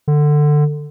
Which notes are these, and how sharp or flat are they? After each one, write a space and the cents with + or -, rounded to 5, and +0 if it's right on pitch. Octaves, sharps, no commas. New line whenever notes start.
D3 +15